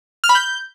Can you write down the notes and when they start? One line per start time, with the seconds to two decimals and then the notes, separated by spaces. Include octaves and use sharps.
0.24 F6
0.29 B5
0.35 G6